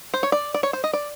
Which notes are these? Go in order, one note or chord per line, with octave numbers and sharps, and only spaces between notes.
C5
C#5
D5
D5
C#5
C5
D#5
D5